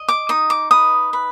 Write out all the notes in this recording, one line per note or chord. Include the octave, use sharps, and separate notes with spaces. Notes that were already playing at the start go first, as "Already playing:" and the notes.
Already playing: D#5
D6
D#4 D#6
D6
B4 D#6
B4